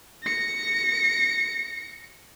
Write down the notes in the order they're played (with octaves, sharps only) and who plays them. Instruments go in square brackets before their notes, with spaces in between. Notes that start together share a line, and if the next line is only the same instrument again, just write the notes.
[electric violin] A#6 C#7